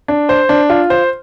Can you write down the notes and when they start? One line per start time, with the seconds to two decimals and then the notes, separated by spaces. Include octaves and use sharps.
0.08 D4
0.29 C5
0.49 D4
0.70 F4
0.90 C5